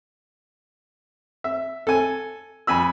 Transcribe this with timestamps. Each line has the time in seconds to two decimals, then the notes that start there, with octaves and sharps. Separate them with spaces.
1.44 E5
1.87 A4 G#5
2.67 F2 G#5 B5 E6